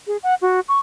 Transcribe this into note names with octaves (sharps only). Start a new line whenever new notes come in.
G#4
F#5
F#4
C#6